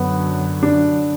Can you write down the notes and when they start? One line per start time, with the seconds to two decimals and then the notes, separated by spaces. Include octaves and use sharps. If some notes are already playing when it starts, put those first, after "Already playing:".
Already playing: F#2 D3 F#3 B3
0.63 D4